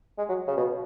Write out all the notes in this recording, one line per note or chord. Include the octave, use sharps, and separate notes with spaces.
G#3
F#3
C#3
B2